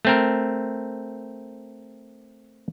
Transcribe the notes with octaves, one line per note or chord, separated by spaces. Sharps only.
A3 C4 A#4